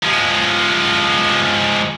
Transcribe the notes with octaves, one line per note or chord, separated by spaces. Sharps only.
F3 G#3